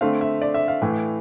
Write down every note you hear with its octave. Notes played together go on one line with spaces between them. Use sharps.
D3 A3 C4 F5
E5
D5
E5
F5
A2 E3 A3